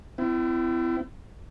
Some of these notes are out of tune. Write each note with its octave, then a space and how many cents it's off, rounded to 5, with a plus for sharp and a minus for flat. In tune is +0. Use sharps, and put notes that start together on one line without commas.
C4 -40 E4 +25